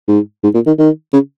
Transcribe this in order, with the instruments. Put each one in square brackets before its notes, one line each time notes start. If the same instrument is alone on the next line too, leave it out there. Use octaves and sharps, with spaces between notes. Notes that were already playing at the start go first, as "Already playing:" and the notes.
[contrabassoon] G#2
G#2
A#2
D#3
D#3
C#3